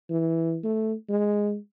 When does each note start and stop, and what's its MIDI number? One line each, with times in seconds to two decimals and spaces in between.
0.10 0.59 52
0.64 0.94 57
1.09 1.57 56